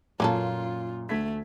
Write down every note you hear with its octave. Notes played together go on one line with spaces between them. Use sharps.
F#2 A#2 A#3 C#4 F4 A4
D2 A3 G#6 B6